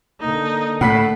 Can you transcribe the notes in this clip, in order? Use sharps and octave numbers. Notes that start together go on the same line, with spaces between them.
D3 A#3 D#4
A2 A3 F#5 B5 B6